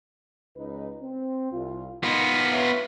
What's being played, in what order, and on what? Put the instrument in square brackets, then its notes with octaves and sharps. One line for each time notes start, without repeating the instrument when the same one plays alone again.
[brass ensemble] C#2 D#4 B4
C4
C2 F4
[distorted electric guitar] B3 F4 [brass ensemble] D#4 A#4
[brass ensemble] B4 C#5 E5